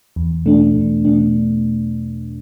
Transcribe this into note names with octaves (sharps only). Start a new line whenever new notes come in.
E2
B2 A3 D4
E2
B2 A3 D4